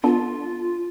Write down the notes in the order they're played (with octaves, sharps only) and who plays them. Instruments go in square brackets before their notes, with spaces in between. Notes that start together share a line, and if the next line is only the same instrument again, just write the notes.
[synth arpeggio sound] B3 D4 A4 [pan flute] F4